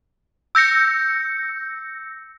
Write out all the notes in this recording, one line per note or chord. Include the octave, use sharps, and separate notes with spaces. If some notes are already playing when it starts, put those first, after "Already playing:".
E6 G6 A#6 C#7